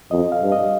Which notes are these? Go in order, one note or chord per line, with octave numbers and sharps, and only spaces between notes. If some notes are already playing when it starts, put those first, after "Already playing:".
F2 D#5
F5
G2
D#5